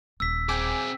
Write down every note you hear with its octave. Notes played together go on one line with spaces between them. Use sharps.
D#1 E6 B6
C4 G#4 G5 G#5 D6